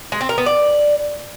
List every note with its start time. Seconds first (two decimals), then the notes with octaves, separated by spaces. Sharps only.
0.12 G#3
0.21 C4
0.29 A#4
0.38 B3
0.46 D5